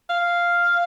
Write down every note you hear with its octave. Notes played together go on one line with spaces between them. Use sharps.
F5